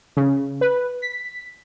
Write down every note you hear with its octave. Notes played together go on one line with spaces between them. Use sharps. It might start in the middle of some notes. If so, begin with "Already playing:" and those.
C#3
B4
B6